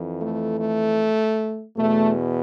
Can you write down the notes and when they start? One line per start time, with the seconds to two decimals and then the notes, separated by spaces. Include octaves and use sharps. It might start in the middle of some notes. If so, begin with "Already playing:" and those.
Already playing: F2 E3
0.20 A3
0.59 A3
1.76 E2 B2 A3